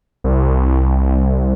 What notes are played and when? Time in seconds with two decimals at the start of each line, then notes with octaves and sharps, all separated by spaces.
0.24 C2